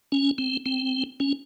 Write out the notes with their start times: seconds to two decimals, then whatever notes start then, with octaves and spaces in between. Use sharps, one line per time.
0.12 C#4
0.38 C4
0.66 C4
1.20 C#4